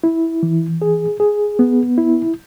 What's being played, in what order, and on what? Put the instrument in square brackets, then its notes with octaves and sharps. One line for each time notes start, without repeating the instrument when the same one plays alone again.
[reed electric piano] E4
E3
G#4
G#4
B3
E4